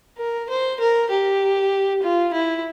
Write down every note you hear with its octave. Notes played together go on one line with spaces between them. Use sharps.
A#4
C5
A#4
G4
F4
E4